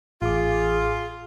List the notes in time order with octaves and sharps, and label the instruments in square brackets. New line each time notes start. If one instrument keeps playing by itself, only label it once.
[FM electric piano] A1 D6 [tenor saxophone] F4 [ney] G#4